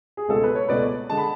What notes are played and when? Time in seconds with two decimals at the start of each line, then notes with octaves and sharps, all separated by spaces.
0.17 G#4
0.28 C#2 B2 A3 A4
0.43 B4
0.55 C#5
0.68 C#2 B2 A3 B4 D5
1.10 D3 G#3 A5
1.17 B5